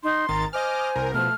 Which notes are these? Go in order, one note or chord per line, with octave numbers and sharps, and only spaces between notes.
D#4 C6
G#1 D#3 A#5 A6
C5 D#5 G#5 D6 F6
C2 A#4
B2 F3 A3 F6